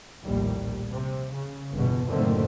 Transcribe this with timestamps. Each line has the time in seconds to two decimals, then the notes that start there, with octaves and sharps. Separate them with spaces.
0.23 A#1 D#2 A2 G3
0.91 C3
1.33 C#3
1.73 G1 E2 B2
2.08 F#1 A2 D3 D#3 A3 C4